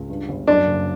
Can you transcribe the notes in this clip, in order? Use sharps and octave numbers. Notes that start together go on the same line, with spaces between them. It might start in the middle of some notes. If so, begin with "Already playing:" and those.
Already playing: C#2
G2
G1
F#2 D4
F#1